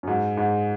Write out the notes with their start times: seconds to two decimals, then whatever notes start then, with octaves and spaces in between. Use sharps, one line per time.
0.03 F#2
0.07 G#2
0.37 G#2